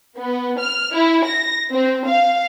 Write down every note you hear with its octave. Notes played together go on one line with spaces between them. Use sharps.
B3
F6
E4
A#6
C4
F5